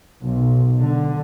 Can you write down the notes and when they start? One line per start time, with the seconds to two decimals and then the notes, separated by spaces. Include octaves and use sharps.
0.21 B1
0.77 D3